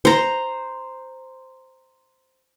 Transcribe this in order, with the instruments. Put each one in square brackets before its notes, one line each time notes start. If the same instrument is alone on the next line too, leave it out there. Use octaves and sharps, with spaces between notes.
[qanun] C5 A#5